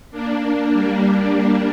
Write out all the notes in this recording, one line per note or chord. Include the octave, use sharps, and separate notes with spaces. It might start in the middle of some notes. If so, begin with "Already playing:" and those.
A#3 D4
A#3 D4
G3 A#3
A#3 D4